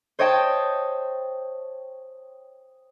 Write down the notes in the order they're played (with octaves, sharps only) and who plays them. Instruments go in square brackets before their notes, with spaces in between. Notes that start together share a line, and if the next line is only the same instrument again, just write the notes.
[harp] C5 C#5 D#5 G5 A5